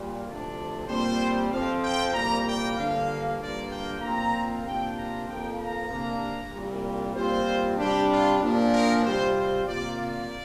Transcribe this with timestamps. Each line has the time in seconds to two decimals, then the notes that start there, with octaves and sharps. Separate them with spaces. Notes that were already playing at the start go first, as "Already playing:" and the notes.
Already playing: A#2 G3
0.25 D2 C3 F3 D4 D5
0.88 A#2 G3 C4 C5
1.50 F2 F3 C4 F5
1.82 G5
2.14 C2 A#2 G3 A#3 A#5
2.45 G5
2.76 G2 D3 F3 A#3 F5
3.39 G2 D3 A#3 F4 D5
3.70 G5
4.01 A#2 F3 C4 F4 A#5
4.64 C3 A#3 D4 F4 G5
4.96 A#5
5.27 F2 F3 A#3 G5
5.59 A#5
5.90 C3 A#3 D4
6.52 C2 A#2 G3
7.15 A#2 G3 C4 F4 C5
7.78 C3 G3 D4 G4
8.09 F4
8.41 A#2 F3 D4
8.71 A#4
9.03 C3 G3 C4 F4 C5
9.35 C5
9.66 C3 A#3 F4 D5
9.98 D5